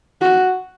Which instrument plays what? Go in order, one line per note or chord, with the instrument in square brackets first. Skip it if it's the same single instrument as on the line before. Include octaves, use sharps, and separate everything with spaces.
[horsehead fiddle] F#4